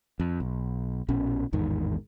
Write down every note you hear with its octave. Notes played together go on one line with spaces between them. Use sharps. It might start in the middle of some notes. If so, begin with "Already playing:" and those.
F2
B1
A#1 B2 C#4
A1 E2 G#2 D#3